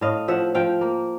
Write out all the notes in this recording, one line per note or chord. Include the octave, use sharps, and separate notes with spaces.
A2 D#5 F5
F3 E5 F#5
F3 F5 G5
A#3